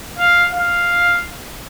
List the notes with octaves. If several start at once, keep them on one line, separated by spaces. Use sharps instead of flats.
F5
F5